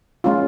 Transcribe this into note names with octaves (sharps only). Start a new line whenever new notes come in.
G#3 C#4 F4